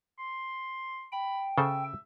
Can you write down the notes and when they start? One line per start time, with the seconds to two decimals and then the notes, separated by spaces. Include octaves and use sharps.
0.19 C6
1.12 G5 B5
1.58 C#3 A4 C5 E5